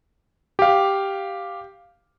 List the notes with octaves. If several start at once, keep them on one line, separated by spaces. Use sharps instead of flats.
G4 F5